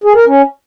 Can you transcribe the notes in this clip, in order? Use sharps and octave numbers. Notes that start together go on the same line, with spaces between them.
G#4
A#4
C#4